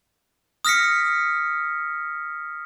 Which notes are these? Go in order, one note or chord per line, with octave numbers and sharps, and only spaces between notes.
D#6 F6 A#6 B6 C#7